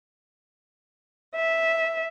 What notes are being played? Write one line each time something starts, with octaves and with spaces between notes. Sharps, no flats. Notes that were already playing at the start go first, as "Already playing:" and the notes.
E5